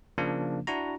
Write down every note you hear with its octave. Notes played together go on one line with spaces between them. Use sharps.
C#3 F3 A#3 D4
D4 E4 F#4 A#5